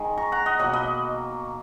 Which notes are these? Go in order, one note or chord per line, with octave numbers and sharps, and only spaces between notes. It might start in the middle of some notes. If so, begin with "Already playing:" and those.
Already playing: D#3 G#3
A#5 C#6
F#5 A#5
D#5 F#5
B2 F#3 A#3 D#5 F#5
B4 D#5